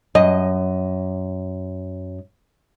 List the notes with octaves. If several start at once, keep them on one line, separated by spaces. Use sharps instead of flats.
F#2 D#5